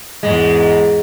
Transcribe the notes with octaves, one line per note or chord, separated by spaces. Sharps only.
E2 G#2 G#3